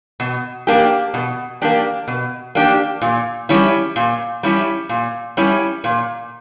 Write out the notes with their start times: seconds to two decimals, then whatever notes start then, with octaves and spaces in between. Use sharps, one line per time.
0.20 B2
0.67 A#3 D4 G4
1.14 B2
1.62 A#3 D4 G4
2.08 B2
2.55 A#3 D4 G4
3.02 A#2
3.49 G3 C#4 E4
3.96 A#2
4.43 G3 C#4 E4
4.89 A#2
5.37 G3 C#4 E4
5.84 A#2